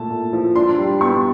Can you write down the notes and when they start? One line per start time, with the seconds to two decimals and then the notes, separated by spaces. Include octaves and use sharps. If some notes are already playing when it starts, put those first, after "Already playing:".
Already playing: A#2 A3 A5
0.10 A#2
0.33 F3
0.55 D4 C6
0.78 G3
1.01 B3 C#6